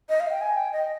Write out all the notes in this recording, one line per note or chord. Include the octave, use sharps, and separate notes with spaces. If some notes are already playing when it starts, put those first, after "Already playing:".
D#5
F5
G5
G#5
G5
D#5